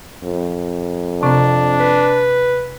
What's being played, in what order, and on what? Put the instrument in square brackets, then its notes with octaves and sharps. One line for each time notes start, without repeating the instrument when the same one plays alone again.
[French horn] F2
[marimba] C3 C4 [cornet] D4
[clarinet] B4